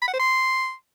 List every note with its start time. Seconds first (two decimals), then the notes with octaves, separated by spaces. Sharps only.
0.02 B5
0.08 F#5
0.14 C5
0.19 C6